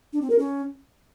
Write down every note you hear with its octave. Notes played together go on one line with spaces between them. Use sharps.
D4
C4
A#4
C#4